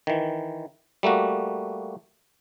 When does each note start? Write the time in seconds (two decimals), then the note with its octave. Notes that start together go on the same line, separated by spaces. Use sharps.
0.07 D#3 E3
1.03 G3 A3 A#3 F#4